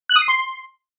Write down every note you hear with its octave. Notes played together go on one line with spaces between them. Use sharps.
F#6
D#6
C7
C6